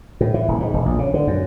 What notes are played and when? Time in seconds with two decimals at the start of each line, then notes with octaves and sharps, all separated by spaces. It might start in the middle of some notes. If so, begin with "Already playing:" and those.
0.21 A2
0.34 E3
0.48 D#1
0.60 G#2
0.74 E1
0.86 A#1
0.99 C#3
1.14 D3
1.27 F#2